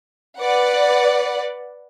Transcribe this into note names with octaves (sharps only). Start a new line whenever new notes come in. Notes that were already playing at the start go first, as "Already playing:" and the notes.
B4 D5 F#5